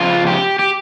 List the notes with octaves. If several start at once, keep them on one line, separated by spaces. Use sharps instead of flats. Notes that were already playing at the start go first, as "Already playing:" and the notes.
Already playing: F2 C#3 F3 F4
G4
G4